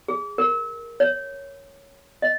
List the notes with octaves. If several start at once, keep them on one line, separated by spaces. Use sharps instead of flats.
G#4
A#4
C#5
D#5